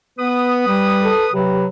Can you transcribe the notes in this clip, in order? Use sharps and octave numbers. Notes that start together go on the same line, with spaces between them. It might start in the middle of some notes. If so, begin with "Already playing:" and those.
B3 B4 D#6
G3
A4
C3 F#3 G4 B4